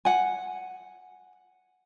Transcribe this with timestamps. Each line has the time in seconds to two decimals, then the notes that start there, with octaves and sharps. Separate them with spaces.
0.05 F#5 G#5